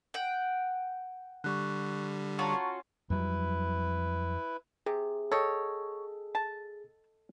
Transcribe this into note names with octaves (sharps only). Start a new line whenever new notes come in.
F#5 G5
D3 G3 C#6 F#6
C#4 F4 F#4 A5 A#5 C#6
F2 F#3 G3 E4 B4
C3 G#4
A4 C#5 D#5 G5
A5